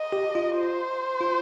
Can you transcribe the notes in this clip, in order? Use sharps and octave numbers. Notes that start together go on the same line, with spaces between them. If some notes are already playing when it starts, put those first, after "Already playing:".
Already playing: D#5
G4
F4
C5
F4